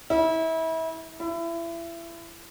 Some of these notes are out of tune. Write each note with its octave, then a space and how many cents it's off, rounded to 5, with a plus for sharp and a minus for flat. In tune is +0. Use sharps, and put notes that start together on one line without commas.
E4 -30
E4 +30